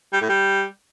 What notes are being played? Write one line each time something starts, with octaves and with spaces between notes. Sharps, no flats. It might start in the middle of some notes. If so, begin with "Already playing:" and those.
G3
A2
G3